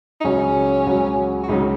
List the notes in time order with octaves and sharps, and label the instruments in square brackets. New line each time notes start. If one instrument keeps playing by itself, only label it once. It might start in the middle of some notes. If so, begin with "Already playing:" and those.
[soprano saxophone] D#4
[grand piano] C#2 C#3 F#3 [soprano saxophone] C#4
[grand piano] C#2 C#3 F#3
[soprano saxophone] F#4
[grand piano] C#2 C#3 F#3 [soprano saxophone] D#4